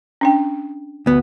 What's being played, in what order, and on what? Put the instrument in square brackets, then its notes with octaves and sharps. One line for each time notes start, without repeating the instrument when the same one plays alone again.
[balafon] C#4 D4 G5
[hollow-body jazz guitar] D2 B3